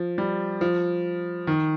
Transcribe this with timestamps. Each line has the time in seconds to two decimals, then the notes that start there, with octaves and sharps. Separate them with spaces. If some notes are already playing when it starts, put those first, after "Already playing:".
Already playing: F3
0.18 G3
0.61 F3
1.47 D#3